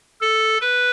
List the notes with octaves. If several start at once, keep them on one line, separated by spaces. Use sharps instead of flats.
A4
B4